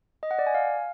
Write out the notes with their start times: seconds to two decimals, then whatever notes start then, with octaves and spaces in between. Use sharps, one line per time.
0.23 D#5
0.31 F#5
0.39 D5
0.47 G#5
0.55 F5